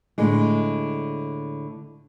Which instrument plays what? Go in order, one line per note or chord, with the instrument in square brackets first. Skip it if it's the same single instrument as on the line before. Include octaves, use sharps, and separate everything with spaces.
[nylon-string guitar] A2 D3 G#3